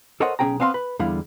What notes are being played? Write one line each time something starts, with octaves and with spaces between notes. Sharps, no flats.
A4 A#4 C5 C#5 D#5 F#5
B1 C#4 G#4 G5 A#5
B3 C4 F5 G#5 C6
B4
E2 D3 G3 E4 F5